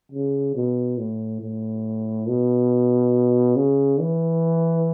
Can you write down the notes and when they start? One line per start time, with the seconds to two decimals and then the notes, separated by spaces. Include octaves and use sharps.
0.12 C#3
0.56 B2
0.98 A2
1.41 A2
2.28 B2
3.56 C#3
4.00 E3